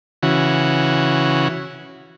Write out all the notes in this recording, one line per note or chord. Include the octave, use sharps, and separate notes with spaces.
C#3 E3 F#4